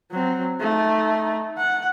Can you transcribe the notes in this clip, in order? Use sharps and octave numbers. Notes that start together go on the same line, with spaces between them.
F#3 C4
A3 D#4
F#5